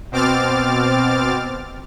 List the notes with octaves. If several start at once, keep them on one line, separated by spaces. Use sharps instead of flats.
B2 C4 D6 F6 A6